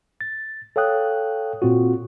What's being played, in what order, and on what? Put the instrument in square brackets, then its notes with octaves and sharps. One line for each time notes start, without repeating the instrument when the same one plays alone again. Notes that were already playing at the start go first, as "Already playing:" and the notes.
[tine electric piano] A6
A4 C#5 F5 G5 D#6 F#6
A#2 C4 F4 F#4